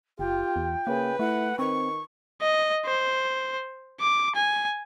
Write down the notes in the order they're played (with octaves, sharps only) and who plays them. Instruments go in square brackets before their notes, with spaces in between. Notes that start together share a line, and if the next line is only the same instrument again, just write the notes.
[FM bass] F#1 [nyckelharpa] F4 [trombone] G4 [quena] G5
[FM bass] E2
[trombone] C#3 [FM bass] A#3 [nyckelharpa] B4
[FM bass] A3 [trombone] E4 [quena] F#5
[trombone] D#3 [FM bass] C4 [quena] C#6
[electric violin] D#5
C5
D6
G#5